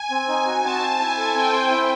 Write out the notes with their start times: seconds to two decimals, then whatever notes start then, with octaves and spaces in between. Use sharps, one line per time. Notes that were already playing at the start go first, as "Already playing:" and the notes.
Already playing: G#5
0.11 C4
0.28 D#4
0.46 F#4
0.63 C4 A5
0.81 C5
0.99 E4 G#5
1.17 A4
1.35 C4 G5
1.52 C5
1.70 E4